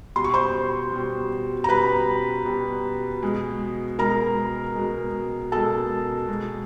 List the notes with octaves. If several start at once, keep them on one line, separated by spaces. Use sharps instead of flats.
B2 G3 C6
C#6
C5 C6
B2 G3
A#5
B2 G3 B4 B5
B2 G3
B2 G#3
B2 G#3 A#4 A#5
B2 G#3
B2 G#3 A4 A5
B2 G#3